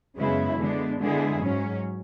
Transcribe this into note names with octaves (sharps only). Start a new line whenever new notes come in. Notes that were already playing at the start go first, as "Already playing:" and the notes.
F#2 C#3 G#3 B3 E4
D3 G#3 B3 D4
D3 G#3 B3 E4 G#4
G#2 F#3 C#4